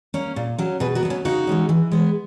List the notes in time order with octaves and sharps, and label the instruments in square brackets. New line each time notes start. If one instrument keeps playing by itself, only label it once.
[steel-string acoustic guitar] A#3 C#4
A#2
F#3 C#4
B2 G#4 B4
F#4 A#4
F#3 B3
C#4
C#3 D#4 F#4
E3 G#3 C#4
E3
G#3 B3